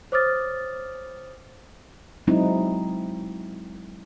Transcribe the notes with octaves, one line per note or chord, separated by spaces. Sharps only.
C5 C#5 D6 D#6 F6 A6
F#3 G#3 C4 D#4 E4